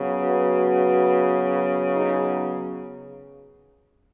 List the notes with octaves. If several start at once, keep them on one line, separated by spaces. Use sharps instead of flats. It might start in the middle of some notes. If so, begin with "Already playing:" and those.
Already playing: C#3 F#3 B3
F#4 B4
D#4 G#4